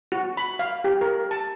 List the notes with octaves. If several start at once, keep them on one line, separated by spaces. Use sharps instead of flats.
F#4
B5
F5
G4
A#4
A5